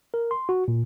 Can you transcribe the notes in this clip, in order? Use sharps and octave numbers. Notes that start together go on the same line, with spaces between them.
A#4
C6
F#4
A#2